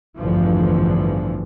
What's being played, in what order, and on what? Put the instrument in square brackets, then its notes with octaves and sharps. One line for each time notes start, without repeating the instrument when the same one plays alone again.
[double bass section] A1 E2 G2 D3 E3 F3